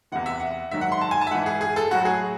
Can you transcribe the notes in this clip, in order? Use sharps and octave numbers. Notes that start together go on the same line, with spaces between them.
E2 C3 E3 F#5
E5
F#5
G#2 D#3 F#3 E5
F#5
C6
A5
G#5
A5
E5
G#2 E3 F#5
G#4
G#4
A4
A2 F#3 F#4
G#4